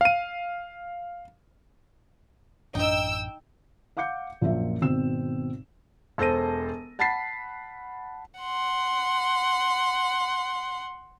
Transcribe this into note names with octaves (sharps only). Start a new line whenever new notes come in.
F5 D#7
A1 F#2 D4 D#4 G5 E6
F5 F#5 D6 G6 C#7
A#1 F#2 A#3 F4 E5
G#1 B2 C4 E6 E7
E1 A4 C5 A5 A#6 D#7
F#5 A5 B5 A6 B6 C7
F#5 C6